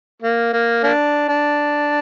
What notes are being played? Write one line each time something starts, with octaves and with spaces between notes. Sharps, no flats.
A#3
A#3
A#3 D4
D4